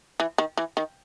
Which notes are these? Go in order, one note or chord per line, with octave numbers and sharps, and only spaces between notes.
E3
D#3
E3
D#3